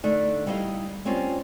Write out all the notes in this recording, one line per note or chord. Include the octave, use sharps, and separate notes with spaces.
D3 A3 D4 D#4
G3 D#4 E4 C5 D#5 F5
G3 A#3 C4 C#4 F4